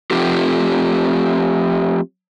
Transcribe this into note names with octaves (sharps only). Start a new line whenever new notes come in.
F3 A3 C4 F4 G4